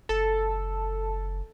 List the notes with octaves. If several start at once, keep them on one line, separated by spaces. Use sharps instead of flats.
F#1 A4